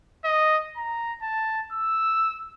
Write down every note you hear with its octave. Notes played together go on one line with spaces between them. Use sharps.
D#5
A#5
A5
E6